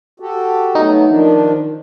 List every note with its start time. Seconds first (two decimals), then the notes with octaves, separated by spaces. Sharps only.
0.20 F#4 G4 A4
0.75 F#3 A3 B3 D#4
1.08 D#3 F3 D4